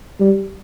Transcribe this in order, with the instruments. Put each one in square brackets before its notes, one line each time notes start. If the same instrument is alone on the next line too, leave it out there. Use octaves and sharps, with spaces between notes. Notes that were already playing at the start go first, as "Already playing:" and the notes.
[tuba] G3